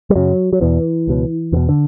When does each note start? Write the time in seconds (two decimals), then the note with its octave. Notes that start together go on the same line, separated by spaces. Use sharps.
0.10 G3
0.15 F#2 C#3 F#3
0.53 F#3
0.61 E2 B2 E3
1.07 C#2 B2
1.52 E2 D3
1.56 B2
1.69 D3